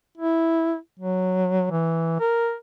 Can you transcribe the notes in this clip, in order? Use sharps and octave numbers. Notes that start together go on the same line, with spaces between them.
E4
F#3
E3
A#4